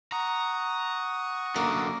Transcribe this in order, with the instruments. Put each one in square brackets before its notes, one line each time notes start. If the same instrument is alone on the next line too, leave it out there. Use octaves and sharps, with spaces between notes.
[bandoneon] F#5 C#6 D#6 [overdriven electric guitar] A#5
[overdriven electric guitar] F#2 D3 [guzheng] A#3